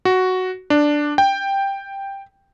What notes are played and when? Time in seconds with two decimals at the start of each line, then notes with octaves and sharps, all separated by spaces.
0.05 F#4
0.70 D4
1.18 G5